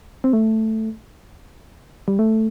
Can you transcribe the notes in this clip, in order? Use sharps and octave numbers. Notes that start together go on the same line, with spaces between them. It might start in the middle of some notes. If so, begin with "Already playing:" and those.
C4
A3
G3
A3